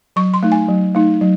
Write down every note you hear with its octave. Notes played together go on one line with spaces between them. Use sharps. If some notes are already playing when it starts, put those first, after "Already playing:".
F#3 C#6
C6
A3 D#4
G#5
F#3
A3 D#4
F#3